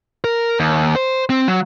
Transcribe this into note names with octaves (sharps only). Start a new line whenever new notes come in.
A#4
D#2
C5
C4
F#3